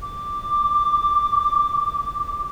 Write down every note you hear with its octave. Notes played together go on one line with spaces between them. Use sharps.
D6